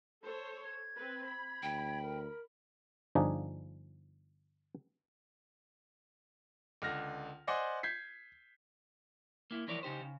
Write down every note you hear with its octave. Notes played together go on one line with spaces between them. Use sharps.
A4 C5 C#5
G#6
C4 B4
B5
D2 G5
A#4
G1 F3 D4 D#4 G#4
C#2 D3 F6 A#6
C5 D5 D#5 F#5 G#5 C6
G6 G#6 B6 C7
A#3 E4
E3 F3 E4 A#4 C#5 D5
C#3 D#4 G4 C5
C#3